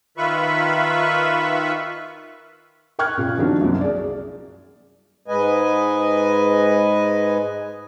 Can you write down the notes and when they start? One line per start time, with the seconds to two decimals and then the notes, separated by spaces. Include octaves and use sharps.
0.17 D#3 F4 B4 E5 B5 C#6
2.99 A#4 G5 C#6 F6 F#6 G#6
3.17 A#2 C#3
3.38 D#3 F3 A#3 C4 D4 F#4
3.61 C2 F#2
3.81 G#4 D5
5.28 G#2 G#3 B4 D#5 G#5